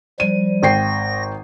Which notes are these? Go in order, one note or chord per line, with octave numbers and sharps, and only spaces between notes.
F3 G3 D#7
G#1 G5 A#6 C7